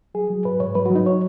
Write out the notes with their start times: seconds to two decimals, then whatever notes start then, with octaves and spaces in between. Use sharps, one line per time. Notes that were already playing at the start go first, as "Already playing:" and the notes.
0.14 F#3 G#4
0.30 F#3
0.45 G#2 B4
0.60 G#2 C#5
0.75 F#3 B4
0.86 F#4
0.90 F#3
0.95 D#4
1.06 C#5